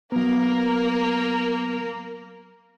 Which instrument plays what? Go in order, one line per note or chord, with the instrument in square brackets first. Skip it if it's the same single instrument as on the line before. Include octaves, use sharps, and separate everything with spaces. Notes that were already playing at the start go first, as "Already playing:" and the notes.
[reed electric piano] F#3 B3 [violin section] A#3 A#4